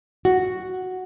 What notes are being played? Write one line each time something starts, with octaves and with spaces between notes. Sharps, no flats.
F#4